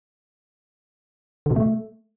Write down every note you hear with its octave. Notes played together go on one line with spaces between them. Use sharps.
D3
B2
A3